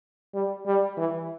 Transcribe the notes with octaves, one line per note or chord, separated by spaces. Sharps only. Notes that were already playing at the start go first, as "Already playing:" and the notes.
G3
G3
E3